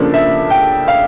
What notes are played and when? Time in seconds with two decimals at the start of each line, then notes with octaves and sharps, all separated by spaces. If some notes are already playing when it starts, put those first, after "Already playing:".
Already playing: C#3 F3 A#3 D4 A4
0.14 E5
0.50 G5
0.88 F5